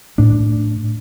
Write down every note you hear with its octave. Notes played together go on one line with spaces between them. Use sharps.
A2 A3 D4